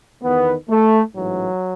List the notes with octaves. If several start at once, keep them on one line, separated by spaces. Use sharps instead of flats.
E2 D#3 B3
A3
A1 G#2 E3 F#3